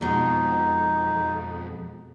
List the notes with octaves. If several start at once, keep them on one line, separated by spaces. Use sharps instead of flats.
F2 B2 G#3 D#4